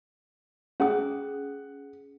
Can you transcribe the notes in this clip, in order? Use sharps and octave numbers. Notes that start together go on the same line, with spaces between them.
C#4 G#4 F#5 D#6